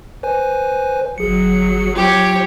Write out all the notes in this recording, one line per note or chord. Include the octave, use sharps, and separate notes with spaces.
B4 C5 G#5
G1 F#3 G#4 C#7
F4 G4 C#5